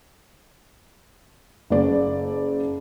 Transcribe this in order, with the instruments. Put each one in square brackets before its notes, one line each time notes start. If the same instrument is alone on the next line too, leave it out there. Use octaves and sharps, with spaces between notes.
[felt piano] F#1 D5